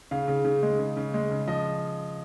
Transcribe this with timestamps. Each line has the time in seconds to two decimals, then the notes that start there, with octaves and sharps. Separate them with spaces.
0.11 C#3 F5
0.28 C#3
0.45 C#3
0.63 G#3
0.79 C#3
0.97 C#3
1.14 G#3
1.31 C#3
1.47 F3 D#5